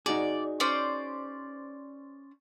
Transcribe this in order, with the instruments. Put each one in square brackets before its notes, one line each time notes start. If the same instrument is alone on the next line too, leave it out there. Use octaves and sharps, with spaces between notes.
[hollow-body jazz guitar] D#4 F#4 G#4 [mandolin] D5
[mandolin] C#4 C5 D5